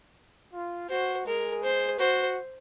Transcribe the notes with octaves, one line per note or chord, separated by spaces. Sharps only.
F4
F#4 C5
G#3 G#4 A#4
C5
F#4 C5